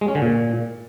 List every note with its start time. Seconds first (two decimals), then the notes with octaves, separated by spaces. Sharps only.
0.01 G#3
0.08 C#4
0.15 D3
0.22 A#2